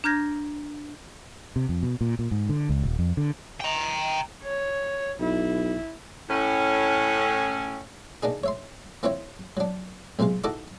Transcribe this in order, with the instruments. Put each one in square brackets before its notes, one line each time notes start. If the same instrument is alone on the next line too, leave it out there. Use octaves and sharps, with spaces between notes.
[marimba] D4 A#5 F6 G6 G#6 A#6
[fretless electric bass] C3
F2
B2
A#2
A#2
G#2
D3
C#2
D#1
F2
D3
[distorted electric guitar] G5 A#5
[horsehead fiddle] C#5
[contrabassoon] B1 [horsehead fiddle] E4
[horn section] A2 C#4
[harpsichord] A#3 D4 D#4 G#4
C#5 E5 C6
A#3 C4 E4 F4 C#5 E5
F#3 D4
B1 C3 G#3 F4 F5
D#4 E4 F#4 A4 D#5 D6